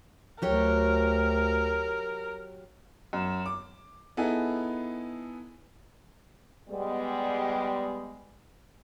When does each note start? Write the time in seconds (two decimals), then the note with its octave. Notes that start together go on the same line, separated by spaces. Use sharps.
0.42 D2 F#3 G4 A#4 C#5
3.13 F#2
3.46 D6
4.17 B3 D#4 E4 G#4 A4
6.70 G3 G#3 B3